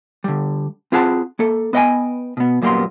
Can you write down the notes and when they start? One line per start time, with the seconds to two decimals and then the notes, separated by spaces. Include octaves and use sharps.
0.24 D3 G3
0.92 C4 F4 G#4 F#5 G#5 A5
1.39 A#3 A4
1.73 B3 B4 D#5 F5 G5 G#5
2.37 B2 B3
2.62 F#2 A#2 G3 A#3 B3 C6